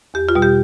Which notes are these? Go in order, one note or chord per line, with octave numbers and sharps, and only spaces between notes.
E2 G4
F4
B2 G3
G4